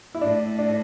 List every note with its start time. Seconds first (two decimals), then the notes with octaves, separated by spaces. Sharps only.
0.15 E4
0.21 A2 D4
0.58 D4